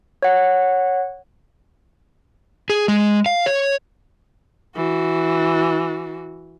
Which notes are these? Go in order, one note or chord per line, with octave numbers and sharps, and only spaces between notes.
C#5 F#5
G#4
G#3
F5
C#5
E3 F#4